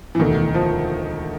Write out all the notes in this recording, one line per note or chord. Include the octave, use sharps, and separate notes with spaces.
E3
E1 D2 D3 D#3
F3